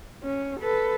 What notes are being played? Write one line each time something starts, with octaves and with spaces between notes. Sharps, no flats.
C#4
A4 B4